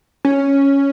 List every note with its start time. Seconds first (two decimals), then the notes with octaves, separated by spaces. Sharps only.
0.25 C#4